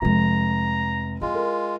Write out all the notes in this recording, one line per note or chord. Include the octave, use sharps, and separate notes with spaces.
F1 C3 G#3 A#5
G#3 E4 F4
A#4